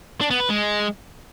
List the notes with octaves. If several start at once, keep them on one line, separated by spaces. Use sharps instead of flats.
D4
B3
B4
G#3